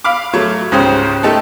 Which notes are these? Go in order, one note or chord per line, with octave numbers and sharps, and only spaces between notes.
F5 B5 D6
F#3 A3 C#5
C#2 G#2 C#3 C#4 G4 C5
A3 D#4 G4 A4